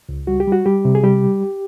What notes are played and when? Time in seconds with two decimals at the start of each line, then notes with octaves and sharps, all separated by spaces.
0.09 C#2
0.27 G3 F#4
0.40 G4
0.47 G3
0.52 F#4
0.66 G3 G4
0.85 C3
0.95 G#4
1.03 G3 G4